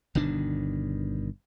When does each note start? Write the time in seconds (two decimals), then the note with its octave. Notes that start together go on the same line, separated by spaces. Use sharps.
0.15 G1 B2 D#3 D4